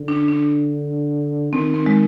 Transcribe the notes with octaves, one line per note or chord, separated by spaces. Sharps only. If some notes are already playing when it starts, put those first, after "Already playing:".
Already playing: D3
D4
D4
D#3 C4
C4
G#3